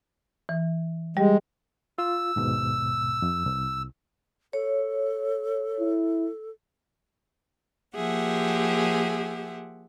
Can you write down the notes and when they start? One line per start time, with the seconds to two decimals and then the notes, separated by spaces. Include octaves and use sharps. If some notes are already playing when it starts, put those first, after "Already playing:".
0.49 E3
1.17 G3 G#3 G4
1.98 F4 E6
2.36 D#2 G#2 B2
3.22 F2
3.46 C2
4.53 A4 C#5
5.80 E4
7.96 F3 A#3 G4 G#4 E5 F#5